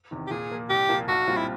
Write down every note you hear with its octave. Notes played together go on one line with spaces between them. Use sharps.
E2 C3 D#3
G4
A#2 G#4
F3 A#3
C2 G4
A#2 F3 A#3
B1 F#4
A#2 G3 C4 F4
E4